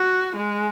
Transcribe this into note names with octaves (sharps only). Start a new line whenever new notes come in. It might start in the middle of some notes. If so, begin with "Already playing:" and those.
Already playing: F#4
G#3